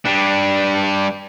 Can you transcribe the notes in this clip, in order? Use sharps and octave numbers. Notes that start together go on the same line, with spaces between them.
G3 D4